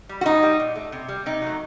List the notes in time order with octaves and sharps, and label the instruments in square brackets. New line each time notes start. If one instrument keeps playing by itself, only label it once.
[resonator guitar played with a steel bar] G3
F#4
A2 D#4
G3
A#2
A3
C3
G3
C3 D#4
F#3 A3